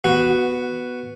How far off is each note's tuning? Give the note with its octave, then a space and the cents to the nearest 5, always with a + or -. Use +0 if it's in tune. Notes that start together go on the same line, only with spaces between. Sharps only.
B3 +0 F#4 +0